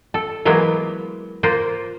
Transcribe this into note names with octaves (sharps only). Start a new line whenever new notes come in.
A4
E3 F#3 G#3 A#3 B3
A#3 F4 C5